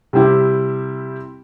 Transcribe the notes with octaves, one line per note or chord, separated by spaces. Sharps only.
C3 G3 C4 E4 G4